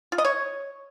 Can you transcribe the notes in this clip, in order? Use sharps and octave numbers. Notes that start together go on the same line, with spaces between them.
F4
D#5
C#5